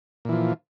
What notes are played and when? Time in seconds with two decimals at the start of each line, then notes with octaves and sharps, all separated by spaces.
0.25 A#2
0.29 E3
0.33 F3